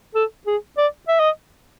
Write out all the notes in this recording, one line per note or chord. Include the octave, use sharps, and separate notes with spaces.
A4
G#4
D5
E5
D#5